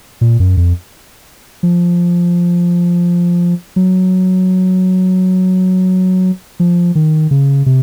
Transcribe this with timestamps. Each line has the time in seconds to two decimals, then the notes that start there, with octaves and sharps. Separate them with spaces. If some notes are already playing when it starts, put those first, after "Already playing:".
0.21 A#2
0.40 F#2
0.57 F2
1.63 F3
3.76 F#3
6.60 F3
6.95 D#3
7.31 C#3
7.66 C3